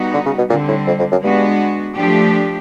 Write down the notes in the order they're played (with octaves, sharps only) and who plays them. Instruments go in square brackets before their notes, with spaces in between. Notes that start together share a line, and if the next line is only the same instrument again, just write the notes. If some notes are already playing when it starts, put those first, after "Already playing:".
Already playing: [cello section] G3 B3 D#4 F#4
[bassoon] D3
C#3
B2
[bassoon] A#2 [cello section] D3 G3 C4
[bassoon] A2
F2
F2
F#2
[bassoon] G2 [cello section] G#3 B3 D4 F#4
[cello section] F3 A3 D4 G4